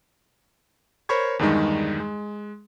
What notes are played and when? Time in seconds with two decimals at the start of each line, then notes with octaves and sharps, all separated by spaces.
1.09 A#4 C5 C#5 B5 C#6 G#6
1.39 E2 G2 D#3 G3 G#3 D#4
2.00 G#3